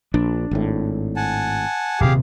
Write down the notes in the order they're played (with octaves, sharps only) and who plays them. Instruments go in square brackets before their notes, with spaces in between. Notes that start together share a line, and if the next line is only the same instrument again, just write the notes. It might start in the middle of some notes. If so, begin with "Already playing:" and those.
[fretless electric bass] A#1 [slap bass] D4
[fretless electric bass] G#1 A2
[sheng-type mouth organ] F#5 G#5 A5
[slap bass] D#1 C3 [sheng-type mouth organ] G4 G#4 F5